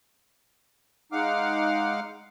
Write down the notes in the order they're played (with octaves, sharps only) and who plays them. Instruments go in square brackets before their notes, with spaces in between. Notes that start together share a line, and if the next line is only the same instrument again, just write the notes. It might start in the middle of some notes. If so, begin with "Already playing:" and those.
[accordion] G#3 D#4 F5 F#5 D6 F6